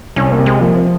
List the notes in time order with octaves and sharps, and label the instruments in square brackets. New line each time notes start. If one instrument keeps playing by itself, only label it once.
[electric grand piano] C2 [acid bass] C#4
[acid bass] A#3
[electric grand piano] C3
[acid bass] G#3
[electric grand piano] F3 [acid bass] A#3
[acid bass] C4